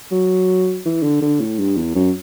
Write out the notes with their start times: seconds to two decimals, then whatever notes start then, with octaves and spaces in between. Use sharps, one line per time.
0.11 F#3
0.86 E3
1.03 D3
1.22 D3
1.40 A2
1.59 G2
1.77 E2
1.95 F#2